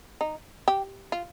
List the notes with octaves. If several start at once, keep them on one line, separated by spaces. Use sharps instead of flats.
D#4
G4
F4